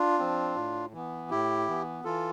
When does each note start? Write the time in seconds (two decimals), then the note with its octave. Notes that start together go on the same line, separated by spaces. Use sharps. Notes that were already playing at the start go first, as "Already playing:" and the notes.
Already playing: D4 F4
0.19 F3 C4
0.56 A2
0.93 E3 B3
1.30 A2 E4 G4
1.68 E3 B3
2.04 E3 F4 A4